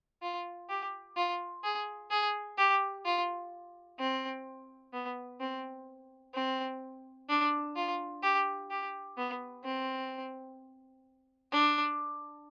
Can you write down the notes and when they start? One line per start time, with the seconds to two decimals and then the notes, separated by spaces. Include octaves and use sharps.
0.22 F4
0.69 G4
1.17 F4
1.63 G#4
2.10 G#4
2.58 G4
3.05 F4
3.99 C4
4.93 B3
5.40 C4
6.34 C4
7.29 D4
7.76 F4
8.23 G4
8.70 G4
9.17 B3
9.64 C4
11.52 D4